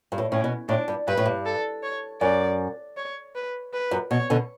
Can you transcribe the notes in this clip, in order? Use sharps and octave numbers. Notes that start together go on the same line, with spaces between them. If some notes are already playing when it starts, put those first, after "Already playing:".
G2
A2
A2 C#4
B2
A2 D4
G2
G2 B4
A2
G2
A4
C#5
F#2 D5
C#5
B4
B4
F#2
B2 C#5
B2 D3